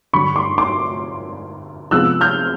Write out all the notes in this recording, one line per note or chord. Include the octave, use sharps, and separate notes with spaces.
G2 D3 F#3 B5 C#6
C6 D6
C6 D6
C3 F3 G#3 B3 E6 F#6
F6 G6